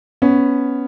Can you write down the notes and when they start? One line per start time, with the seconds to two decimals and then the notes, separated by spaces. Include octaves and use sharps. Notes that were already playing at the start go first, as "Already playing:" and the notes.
0.22 B3 C#4